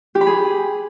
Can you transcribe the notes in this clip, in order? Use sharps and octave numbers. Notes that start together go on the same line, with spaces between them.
G4
B5
G#4